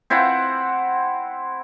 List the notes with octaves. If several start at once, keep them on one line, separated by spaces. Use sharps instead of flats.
C4 E4 C5 F#5